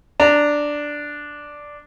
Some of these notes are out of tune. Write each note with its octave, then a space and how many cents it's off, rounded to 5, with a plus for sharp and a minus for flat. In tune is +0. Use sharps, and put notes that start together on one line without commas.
D4 +0 A#5 -20